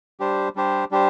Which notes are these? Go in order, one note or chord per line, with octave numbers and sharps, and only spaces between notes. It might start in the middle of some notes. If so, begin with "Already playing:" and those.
G3 D4 G4 C5
G3 D4 G4 C5
G3 D4 G4 C5